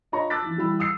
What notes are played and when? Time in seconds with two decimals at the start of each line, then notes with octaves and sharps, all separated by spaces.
0.12 D4 F4 C#5 D#5 A#5 C#6
0.30 A5 D6 E6 F#6 A6 B6
0.42 E3 F3
0.57 E3 G3 E4 B5 E6
0.79 D#6 E6 C7